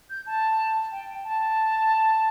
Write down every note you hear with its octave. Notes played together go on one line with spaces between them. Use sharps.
G6
A5
G5
A5